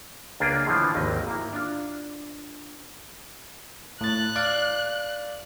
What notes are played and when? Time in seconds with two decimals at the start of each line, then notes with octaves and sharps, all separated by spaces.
0.40 C#2 A#3 D4 F4 G#4 G5
0.66 A2 D3 E3 F3
0.94 G#1 D#2 D#5
1.27 A#3 E4
1.53 D4 F4
4.01 A2 F#6 A6
4.36 D5 F5 D6